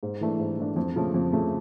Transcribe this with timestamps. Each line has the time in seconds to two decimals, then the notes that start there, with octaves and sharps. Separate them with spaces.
0.03 G#2
0.21 E3 A3 D4
0.39 G#2
0.59 E3 A3 D4
0.76 F2
0.96 C#3 F3 A3
1.14 F2
1.33 C#3 F3 A3